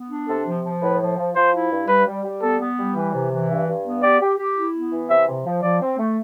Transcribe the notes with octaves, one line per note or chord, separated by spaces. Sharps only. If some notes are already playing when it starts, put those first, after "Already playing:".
Already playing: B3
D4
C3 A4
F3
F3
A2 B4
F3
F3
F3 C5
E4
G2
G3 B4
G3
G3
B3 A4
B3
G3
E3 B4
C3
E3
G2 E5
G2
B3
G4 D5
G4
G4
E4
B3
E3
C3 E5
C3
F3
F3 D5
C4
A3